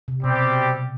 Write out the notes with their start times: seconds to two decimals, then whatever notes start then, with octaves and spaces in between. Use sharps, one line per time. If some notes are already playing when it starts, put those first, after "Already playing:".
0.08 C3
0.23 B2 G3 C4 G4